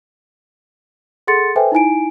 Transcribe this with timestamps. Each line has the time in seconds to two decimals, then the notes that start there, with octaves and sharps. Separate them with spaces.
1.27 G#4 A4 F#5 C6 A6 C#7
1.55 A4 B4 C5 E5 G5 G#5
1.72 D#4 E4 G#5 D7